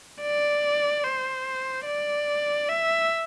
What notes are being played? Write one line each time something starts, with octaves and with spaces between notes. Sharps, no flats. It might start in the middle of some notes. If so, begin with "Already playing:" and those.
D5
C5
D5
E5